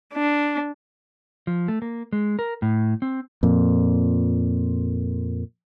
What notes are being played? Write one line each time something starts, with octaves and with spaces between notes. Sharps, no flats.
D4
F3
A3
A#3
G#3
A#4
A2
C4
F2 A#2